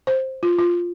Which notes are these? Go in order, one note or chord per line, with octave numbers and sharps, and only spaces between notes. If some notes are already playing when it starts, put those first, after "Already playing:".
C5
F4
F4